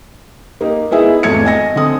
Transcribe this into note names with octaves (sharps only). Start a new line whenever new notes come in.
A#3 D#4 G4
B3 D#4 E4 G#4 E5
G#1 E2 A3 G#6 C#7
D#5 G#5 A#6
D3 C4 D#6